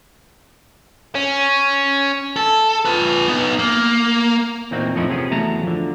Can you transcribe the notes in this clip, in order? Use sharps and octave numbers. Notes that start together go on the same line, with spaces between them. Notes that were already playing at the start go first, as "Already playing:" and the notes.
C#4
A4
F4 B4
B3 D#4
A#3
E2 A#2 A#3 C4 D#4 F#4
F2 A2 F3 C#4 D#4 E4
C3 F3 B3 C#4 G#4
E2 F#3 A3 A5 A#5
D3 F3